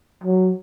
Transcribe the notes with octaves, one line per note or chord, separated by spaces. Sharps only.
F#3